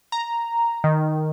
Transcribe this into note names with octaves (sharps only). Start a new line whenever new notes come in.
A#5
D#3